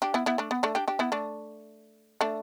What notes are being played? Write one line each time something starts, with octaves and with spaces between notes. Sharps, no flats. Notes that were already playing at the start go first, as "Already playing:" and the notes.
D4 G4
B3 E4
B3 E4
A3 D4
B3
A3 D4
D4 G4
D4 G4
B3 E4
A3 D4
A3 D4